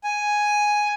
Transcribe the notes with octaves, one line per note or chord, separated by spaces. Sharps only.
G#5